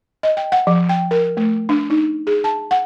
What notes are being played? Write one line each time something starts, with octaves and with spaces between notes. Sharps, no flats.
D#5
G5
F#5
F3
G5
A#4
A3
D4
D#4
G#4
A5
F#5